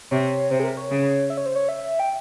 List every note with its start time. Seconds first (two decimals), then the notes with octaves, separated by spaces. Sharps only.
0.11 C3 C#5
0.50 C3 C5
0.60 G#4
0.64 A#4
0.77 C#5
0.91 C#3
1.30 E5
1.37 C#5
1.46 C5
1.56 C#5
1.69 E5
2.00 G5